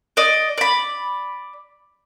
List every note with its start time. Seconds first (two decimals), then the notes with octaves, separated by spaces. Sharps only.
0.17 D5 D#5
0.58 D5 B5